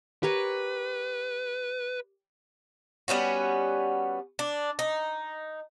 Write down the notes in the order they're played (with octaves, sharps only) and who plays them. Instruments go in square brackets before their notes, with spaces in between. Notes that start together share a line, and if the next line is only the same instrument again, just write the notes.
[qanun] G4 A#4 C#5 [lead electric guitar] B4
[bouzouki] G3 B3 C#4 F#4
D4
D#4